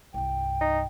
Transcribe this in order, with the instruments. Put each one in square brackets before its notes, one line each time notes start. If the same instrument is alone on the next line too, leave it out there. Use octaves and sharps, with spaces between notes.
[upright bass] C2 G2 [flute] G5
[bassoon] D#4